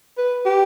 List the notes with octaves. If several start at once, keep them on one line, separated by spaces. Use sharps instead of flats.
B4
G4